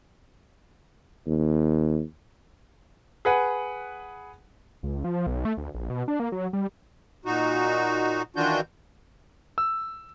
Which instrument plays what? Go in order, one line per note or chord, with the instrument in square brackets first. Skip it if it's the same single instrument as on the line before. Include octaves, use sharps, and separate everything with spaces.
[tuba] D#2
[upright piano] G#4 B4 F#5
[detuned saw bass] C#2
F3
B1
A3
D2
A#1
B2
D4
A#3
F#3
G3
[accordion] A#2 D#4 F#4
D#3 E3 D4 F4 F#4 G6
[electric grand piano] E6